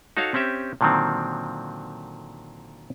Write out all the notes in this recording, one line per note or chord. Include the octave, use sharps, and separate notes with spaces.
D#4 F#4 A4 C#5 F5
C4 C#4 G4 E5
A#2 D3 D#3 F#3 C4